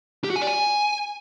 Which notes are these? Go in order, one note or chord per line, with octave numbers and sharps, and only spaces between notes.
G4
F#4
G#5
D5
G#5